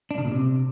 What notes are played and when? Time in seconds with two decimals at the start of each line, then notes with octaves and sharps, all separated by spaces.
0.11 D4
0.18 C#3
0.25 A#2
0.32 C3